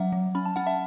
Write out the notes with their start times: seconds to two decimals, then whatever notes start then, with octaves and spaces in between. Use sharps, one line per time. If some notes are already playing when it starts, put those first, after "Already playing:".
Already playing: F#3 C#4 E5 F#5
0.12 F#3
0.35 C#4 B5
0.45 A5
0.56 C#4 F#5
0.67 E5 A5